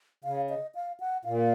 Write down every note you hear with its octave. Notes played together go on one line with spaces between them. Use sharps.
C#3 F5
D#5
F5
F#5
A#2 F5